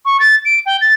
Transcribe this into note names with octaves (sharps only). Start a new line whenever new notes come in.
C#6
A6
D7
G5
A6